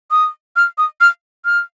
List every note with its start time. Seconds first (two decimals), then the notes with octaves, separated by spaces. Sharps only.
0.11 D#6
0.56 F6
0.78 D#6
1.01 F6
1.45 F6